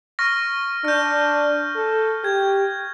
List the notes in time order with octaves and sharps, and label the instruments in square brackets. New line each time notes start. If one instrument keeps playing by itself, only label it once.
[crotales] C#6 F6 A#6
[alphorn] D4 [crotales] F6 G6
[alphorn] A4
[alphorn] G4 [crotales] G#6